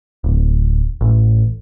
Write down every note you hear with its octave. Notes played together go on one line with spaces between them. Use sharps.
D1
A1